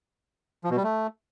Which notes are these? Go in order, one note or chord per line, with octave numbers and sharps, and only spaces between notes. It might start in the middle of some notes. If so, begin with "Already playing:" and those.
F3
B2
G3
A3